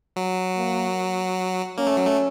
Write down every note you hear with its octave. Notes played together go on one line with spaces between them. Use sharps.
F#3
A#3
A#3 C#4
A3
F#3
A3